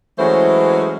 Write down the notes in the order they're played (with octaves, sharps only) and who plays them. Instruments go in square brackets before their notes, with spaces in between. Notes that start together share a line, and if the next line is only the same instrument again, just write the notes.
[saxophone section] E3 F#3 G#3 A3 C#4 C5